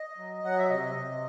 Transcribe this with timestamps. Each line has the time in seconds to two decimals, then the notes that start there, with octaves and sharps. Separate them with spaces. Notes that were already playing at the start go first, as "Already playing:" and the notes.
Already playing: D#5
0.18 F#3
0.44 F#3 F#5
0.58 E5
0.70 C3 D#5
0.96 C3